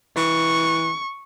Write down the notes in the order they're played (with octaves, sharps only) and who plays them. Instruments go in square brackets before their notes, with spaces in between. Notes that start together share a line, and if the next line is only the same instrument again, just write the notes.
[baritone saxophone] E3 [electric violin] C#6